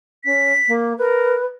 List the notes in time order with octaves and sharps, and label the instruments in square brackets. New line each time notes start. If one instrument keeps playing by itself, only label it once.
[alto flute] C#4 [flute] B6
[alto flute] A#3
[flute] A#4 [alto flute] B4